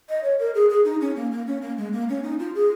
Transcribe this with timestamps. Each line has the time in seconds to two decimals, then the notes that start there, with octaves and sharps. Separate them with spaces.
0.09 D#5
0.24 C#5
0.39 A#4
0.55 G#4
0.70 G#4
0.85 D#4
1.01 C#4
1.16 A#3
1.32 A#3
1.47 C#4
1.62 A#3
1.77 G#3
1.93 A#3
2.09 C#4
2.23 D#4
2.39 F4
2.55 G#4